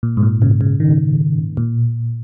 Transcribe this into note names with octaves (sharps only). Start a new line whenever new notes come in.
A#2
G#2
A#2
C#3
C#3
D#3
A#2